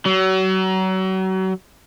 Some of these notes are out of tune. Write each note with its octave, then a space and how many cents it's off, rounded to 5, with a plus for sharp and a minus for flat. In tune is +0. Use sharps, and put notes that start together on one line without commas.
F#3 +35